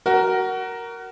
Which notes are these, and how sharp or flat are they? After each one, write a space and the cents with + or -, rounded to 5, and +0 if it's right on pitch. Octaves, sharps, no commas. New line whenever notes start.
F#4 +20 A#4 +0